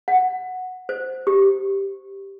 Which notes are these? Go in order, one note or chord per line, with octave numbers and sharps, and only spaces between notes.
F#5
C5
G4